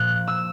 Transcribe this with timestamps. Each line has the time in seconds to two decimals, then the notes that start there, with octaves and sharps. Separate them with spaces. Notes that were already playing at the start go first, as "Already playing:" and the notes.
Already playing: A#2 F3 F#6
0.27 E6